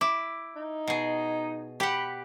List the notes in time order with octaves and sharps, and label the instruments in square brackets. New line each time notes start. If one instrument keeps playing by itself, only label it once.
[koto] E4 [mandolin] D6
[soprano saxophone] D#4
[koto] B2 G#4
[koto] G4 F#5 [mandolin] G5 B5